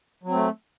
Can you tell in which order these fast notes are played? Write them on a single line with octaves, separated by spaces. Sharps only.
F#3 C4 A3